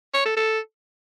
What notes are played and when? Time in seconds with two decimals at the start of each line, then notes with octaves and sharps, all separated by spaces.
0.14 C#5
0.25 A4
0.37 A4